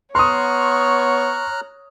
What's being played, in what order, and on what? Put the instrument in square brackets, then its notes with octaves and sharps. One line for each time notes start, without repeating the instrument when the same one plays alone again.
[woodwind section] B3 C#6 [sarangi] C#5 [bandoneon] A#5 F6 F#6 [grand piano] C6 D#6